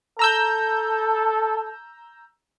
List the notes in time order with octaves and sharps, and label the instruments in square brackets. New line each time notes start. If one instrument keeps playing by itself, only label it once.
[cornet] A4 [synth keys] A#5 E6 G6